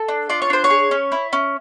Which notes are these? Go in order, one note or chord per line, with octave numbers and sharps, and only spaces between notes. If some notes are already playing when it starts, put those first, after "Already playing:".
Already playing: A4
D4
F4 D5
C#5
D4 C5
C#5
G#4
C#4
E4
C#4